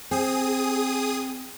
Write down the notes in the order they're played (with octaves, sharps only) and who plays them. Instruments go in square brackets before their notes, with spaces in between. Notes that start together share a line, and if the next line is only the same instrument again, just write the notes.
[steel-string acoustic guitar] C4 [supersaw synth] G#4 D#6